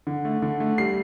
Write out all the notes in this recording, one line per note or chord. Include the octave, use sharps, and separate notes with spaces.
D3
A3
D3
A3
G3 C7